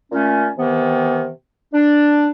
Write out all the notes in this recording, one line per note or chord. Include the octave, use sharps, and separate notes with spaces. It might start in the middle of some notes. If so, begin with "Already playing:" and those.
A#2 A3 C#4
C3 D#3 E3 B3
D4